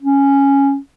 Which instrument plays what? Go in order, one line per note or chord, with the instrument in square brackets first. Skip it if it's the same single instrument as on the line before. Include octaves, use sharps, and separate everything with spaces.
[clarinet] C#4